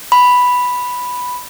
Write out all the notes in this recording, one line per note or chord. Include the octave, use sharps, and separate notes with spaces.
B5